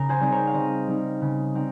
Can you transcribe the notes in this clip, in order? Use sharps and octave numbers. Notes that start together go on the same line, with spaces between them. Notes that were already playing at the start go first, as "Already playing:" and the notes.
Already playing: C#3 A#4
G#4 C5
G3 C4 D#4 C5
A#4 C#5
F5
C#3 C5 D#5
G3 C4 D#4
C#3
G3 C4 D#4